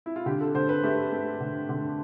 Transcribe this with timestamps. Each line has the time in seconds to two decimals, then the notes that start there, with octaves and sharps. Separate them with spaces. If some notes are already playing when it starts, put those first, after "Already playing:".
0.06 E4
0.16 F4
0.26 D3 G4
0.41 A4
0.55 D3 C5
0.69 B4
0.83 A3 G4
1.12 A3
1.40 D3
1.69 D3